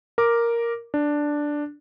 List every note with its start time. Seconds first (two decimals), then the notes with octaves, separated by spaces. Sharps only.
0.18 A#4 D6
0.94 D4